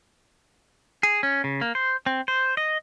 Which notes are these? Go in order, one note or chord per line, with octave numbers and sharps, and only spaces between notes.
G#4
C#4
C#3
A#3
C5
C4
C5
D#5